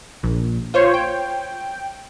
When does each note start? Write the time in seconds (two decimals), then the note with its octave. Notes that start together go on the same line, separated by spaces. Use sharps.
0.23 A#1
0.74 F4 C5 C#5
0.94 G5